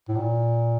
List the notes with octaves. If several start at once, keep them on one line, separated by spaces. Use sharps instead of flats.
A2
A#2